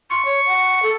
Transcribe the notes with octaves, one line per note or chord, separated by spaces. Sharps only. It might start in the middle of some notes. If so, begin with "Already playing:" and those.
C6 C#6
C#5
F#5
A4